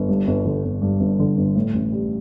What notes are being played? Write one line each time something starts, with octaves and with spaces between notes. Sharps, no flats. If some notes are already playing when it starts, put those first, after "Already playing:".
Already playing: G1
G2
G1
D3
G1
G2
G1
D3
G1
A2
A1
G3